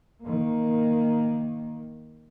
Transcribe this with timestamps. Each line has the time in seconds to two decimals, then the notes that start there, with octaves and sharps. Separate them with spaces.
0.23 D#3 A#3